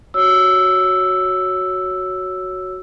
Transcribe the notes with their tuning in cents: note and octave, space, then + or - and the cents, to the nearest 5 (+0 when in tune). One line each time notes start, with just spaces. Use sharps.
F#4 +0 C#5 +0 E6 +0